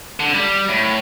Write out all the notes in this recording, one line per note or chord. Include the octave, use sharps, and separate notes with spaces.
D3
G3
A2